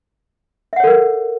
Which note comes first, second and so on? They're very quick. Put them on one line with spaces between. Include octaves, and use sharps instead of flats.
E5 F#5 C#5 A4 A#4